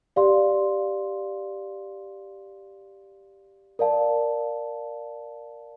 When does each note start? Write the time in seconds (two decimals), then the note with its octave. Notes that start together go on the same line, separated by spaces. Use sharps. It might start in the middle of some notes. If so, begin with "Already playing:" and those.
0.16 G4 D5 F5 C6
3.79 A#4 D5 F5 A5